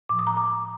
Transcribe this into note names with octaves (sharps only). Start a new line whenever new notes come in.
A2 F3 D6
D#6
A#5 D6
A#5 D6